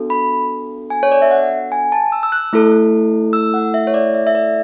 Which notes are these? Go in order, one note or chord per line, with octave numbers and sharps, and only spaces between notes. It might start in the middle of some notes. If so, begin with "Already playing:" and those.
Already playing: B3 D4 F#4 A4
B5
G#5
C#5
D5
E5
F#5
G#5
A5
E6
E6
F#6
A3 E4 A4
E6
F#5
E5
C#5
D5
E5
E5
D5